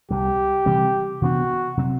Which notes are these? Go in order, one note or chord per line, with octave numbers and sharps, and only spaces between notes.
C2 C3 G3 G4
C3 E3 G3 C4
C3 E3 B3 D4 F#4
C3 F#3 C4